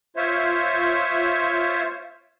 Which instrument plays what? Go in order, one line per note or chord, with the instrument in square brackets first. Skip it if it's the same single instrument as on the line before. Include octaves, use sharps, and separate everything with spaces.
[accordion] F4 C5 C#5 E5